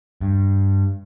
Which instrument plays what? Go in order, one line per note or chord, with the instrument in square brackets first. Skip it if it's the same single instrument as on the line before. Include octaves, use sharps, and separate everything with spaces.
[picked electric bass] G2